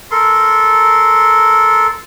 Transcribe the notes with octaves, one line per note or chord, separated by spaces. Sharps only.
A4 A#4 C6